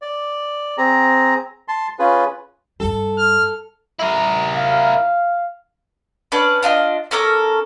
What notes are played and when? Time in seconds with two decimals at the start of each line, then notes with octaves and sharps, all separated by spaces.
0.02 D5
0.78 C4 G#4 A#5
1.68 A5 C6
1.99 C#4 F4 G#4 B4
2.80 G2 G3 A4
3.18 F6
3.99 E4 A#4
4.54 F5
6.32 C#4 D4 B4 D5
6.63 D4 F4 A4 D#5
7.11 C#4 A4 A#4 D6